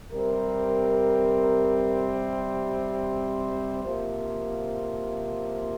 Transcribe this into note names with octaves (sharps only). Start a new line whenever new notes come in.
C3 G3 C4 A#4
C5
C3 F3 A#3